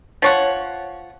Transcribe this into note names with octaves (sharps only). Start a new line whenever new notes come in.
F3 C#5 F#5